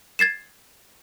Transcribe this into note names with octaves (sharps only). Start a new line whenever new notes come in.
G#6 A6 C7 E7